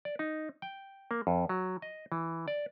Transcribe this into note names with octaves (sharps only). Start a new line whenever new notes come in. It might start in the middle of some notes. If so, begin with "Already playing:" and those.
D5
D#4
G5
A#3
F2
F#3
D#5
E3
D5